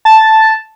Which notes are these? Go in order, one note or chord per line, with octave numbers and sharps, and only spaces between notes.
A5